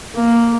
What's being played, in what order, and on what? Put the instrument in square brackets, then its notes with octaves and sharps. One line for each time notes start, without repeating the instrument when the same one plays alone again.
[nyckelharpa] A#3